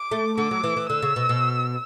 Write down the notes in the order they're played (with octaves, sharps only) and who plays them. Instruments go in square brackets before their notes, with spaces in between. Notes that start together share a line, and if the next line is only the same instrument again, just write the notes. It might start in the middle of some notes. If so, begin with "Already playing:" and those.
Already playing: [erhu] D6
[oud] A3
[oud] D3 [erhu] D6
[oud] F#3
E3
E3
[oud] D3 [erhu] E6
[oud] C#3
B2
B2